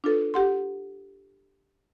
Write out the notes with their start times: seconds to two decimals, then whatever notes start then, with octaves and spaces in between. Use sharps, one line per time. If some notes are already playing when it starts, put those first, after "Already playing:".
0.04 D4 F4 A4 B4
0.34 G4 F#5 C6